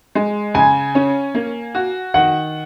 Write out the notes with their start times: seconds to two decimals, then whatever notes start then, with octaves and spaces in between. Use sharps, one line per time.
0.15 G#3
0.54 C#3 G#5
0.95 C#4
1.35 A#3
1.75 F#4
2.14 D#3 F#5